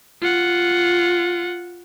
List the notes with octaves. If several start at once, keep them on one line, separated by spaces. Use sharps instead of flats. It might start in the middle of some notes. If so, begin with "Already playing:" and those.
F4 F#5